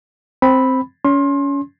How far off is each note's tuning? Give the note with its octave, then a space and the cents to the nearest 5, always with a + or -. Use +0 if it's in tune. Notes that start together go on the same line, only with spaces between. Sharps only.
C4 +0 B5 +0
C#4 +25 C6 +30